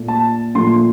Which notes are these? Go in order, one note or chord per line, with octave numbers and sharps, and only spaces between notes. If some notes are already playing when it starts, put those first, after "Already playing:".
Already playing: A#2 A3
A5
A#2 F3 A3 C6